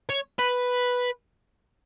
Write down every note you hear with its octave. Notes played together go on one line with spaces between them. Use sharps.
C#5
B4